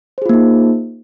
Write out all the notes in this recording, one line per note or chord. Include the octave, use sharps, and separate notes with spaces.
A#3 D#4 F4 G#4 C5